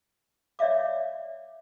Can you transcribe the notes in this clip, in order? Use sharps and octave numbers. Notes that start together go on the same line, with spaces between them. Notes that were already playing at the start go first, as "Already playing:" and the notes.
C#5 D5 E5 F5 D6